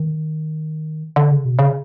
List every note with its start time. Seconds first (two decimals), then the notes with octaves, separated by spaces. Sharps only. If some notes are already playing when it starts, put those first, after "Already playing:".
Already playing: D#3
1.16 D3
1.31 C#3
1.45 B2
1.59 C#3